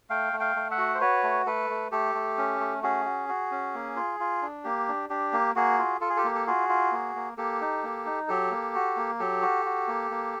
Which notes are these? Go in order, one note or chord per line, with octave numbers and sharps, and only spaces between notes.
A3 F5 G5
A3
F5 G5
A3
E5 F#5
F#4
C5
F#4 B4 C#5
A3
A3 A4 B4
A3
A3 G4 A4
A3
C#4
A3
C#4 F#4 G#4
F#4
F#4
C#4
A#3
F4
F4
D4
A#3 G4
D4
D4 G4
A#3
A#3 F#4 G#4
F4
F4 A4
G#4
G4 A4
A#3
A4
F4 F#4 G#4
F4
A#3
A#3
A#3 G4 A4
D#4
A#3
D#4
F#3 G4 A4
A#3
F#4
A#3
F#3 G4 A4
F#4
F#4
A#3
A#3